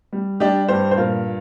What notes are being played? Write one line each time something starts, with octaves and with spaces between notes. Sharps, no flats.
G3
G3 D4 G4
G2 G4 C5
C5
A#2 F4 A#4